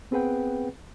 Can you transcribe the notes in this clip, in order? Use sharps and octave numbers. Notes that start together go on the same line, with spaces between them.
B3 C4 G#4 B4 F#5 G5